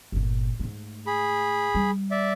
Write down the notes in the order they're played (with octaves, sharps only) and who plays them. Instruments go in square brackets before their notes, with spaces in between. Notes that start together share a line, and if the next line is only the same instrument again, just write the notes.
[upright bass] G1 A#2
G#2 A3
[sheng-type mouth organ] G#4 B5
[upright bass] G3
[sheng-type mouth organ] D5 E5